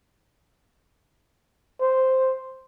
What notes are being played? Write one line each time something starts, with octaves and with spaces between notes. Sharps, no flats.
C5